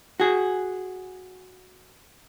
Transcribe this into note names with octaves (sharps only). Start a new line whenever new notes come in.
F#4 G#4